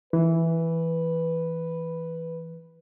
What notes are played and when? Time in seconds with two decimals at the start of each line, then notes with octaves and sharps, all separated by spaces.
0.13 E3 B4